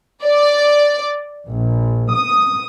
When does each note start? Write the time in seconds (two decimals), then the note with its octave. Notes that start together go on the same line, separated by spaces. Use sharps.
0.24 D5
1.49 A#1
2.14 D#6